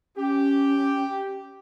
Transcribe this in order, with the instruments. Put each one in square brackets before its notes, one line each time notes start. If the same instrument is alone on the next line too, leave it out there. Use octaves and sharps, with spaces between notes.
[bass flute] C#4 [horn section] G4